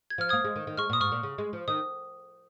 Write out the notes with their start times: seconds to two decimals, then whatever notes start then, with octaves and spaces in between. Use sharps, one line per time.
0.10 G#6
0.18 F3 F6
0.29 A#3 D#6 G#6
0.45 G#3
0.56 D#3
0.67 D#3
0.77 G#3 C#6 F6
0.90 A#2
0.93 D#6
1.00 G#2 C#6 F6
1.12 A#2
1.23 C#3
1.38 G#3
1.53 F3
1.68 D#3 D#6